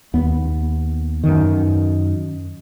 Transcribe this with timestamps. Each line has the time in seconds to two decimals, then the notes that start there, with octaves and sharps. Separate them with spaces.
0.14 D#2 B3
1.24 F#2 D#3